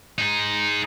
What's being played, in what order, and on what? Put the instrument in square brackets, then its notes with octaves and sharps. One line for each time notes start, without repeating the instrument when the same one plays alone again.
[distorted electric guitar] D#4 G#4